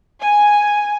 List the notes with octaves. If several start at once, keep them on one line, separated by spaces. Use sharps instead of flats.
G#5